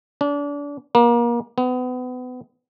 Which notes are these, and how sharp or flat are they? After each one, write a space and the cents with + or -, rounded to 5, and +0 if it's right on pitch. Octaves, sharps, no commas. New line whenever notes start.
D4 -30
A#3 +30
B3 +30